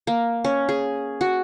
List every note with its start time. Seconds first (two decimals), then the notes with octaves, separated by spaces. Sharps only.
0.07 A#3
0.44 C#4
0.69 G#4
1.21 F#4